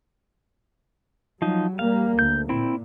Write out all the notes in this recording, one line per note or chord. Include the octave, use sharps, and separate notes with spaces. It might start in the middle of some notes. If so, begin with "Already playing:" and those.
F3 F#3 D#4
G3 A#3 F5
D2 G6
A#2 C4 E4